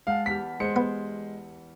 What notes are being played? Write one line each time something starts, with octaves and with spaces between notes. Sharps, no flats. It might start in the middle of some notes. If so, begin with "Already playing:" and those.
G#3 F5 F#5 A5
E2 G4 F6 B6
G#3 C5 C#7
B3